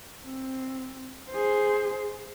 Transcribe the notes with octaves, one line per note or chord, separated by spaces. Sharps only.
C4
G#4 C5